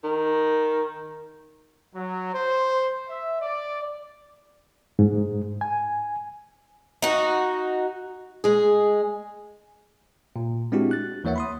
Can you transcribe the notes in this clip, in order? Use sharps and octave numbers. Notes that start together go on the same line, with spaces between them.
D#3
F#3
C5
E5
D5
G#2
G#5
D#4 F#4
G#3 G#4
A#2
G#3 C4 D4 E4 F#4 G4
F#6 A6
D#2 E3 A#3 C#5 E5 F#5
B5 C6 D#6